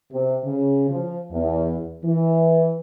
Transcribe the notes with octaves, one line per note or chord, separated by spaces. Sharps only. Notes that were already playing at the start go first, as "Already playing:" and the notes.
C3
C#3
F3
E2
E3